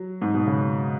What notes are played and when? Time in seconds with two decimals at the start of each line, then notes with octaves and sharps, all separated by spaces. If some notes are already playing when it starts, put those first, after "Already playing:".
Already playing: F#3
0.22 G#2
0.34 B2
0.47 C#3